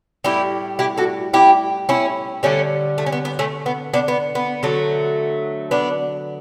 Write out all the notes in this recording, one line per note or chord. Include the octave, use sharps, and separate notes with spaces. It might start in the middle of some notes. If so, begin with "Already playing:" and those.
A2 G3 E4 G4
E4 G4
F#4 A4
E4 G4
C#4 E4
D3 G3 A3 C#4
A3
C#4
B3
B3
A3 C#4
B3
B3 D4
B3
B3
D3 F#3 A3
B3 D4